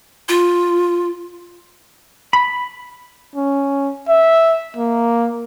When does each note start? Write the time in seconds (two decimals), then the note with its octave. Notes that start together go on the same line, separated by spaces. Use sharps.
0.29 F4
2.33 B5
3.36 C#4
4.09 E5
4.77 A#3